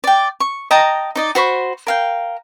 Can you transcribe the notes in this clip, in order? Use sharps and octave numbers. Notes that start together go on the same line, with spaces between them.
D5 G5
C#6
D#5 G5 A5 A#5
D#4 D5 D#5
F#4 C5 B5 C#6
A#4 F5 G5